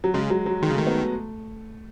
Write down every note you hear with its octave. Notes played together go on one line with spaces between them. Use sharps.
F#3
C#3 G#3
F#3
F#3
D#3 G#3
C#3
D#3 A3
B3
A3